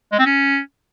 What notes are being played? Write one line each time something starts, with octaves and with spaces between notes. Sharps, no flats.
G#3
C4
C#4